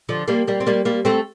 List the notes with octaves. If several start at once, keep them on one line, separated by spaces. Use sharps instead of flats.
D3 F3
G3 A#3
G3 A#3
C4
G3 A#3
G3 A#3
A3 C4